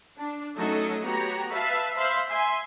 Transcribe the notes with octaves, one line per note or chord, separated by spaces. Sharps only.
D4
F#3 A3 C#4 D#4 A4 D#5
B3 F#4 G4 C#5 A#5
B4 E5 F5 A5
C5 E5 F5 B5 C6
E5 G#5 C6